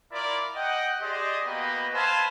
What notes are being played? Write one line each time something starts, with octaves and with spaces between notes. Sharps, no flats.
E4 F4 A#4 D5
D#5 F#5 G5
G4 G#4 C5 D5 D#5
A#3 B3 F#4 B4 D#5 G5
B4 C5 E5 F5 G#5 A5